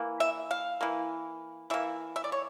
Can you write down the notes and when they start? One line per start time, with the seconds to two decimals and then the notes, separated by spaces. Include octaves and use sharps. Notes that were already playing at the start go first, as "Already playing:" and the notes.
Already playing: E3 A#3
0.20 E5
0.51 F5
0.81 E3 A#3
1.70 E3 A#3 E5
2.16 E5
2.24 D5
2.32 C#5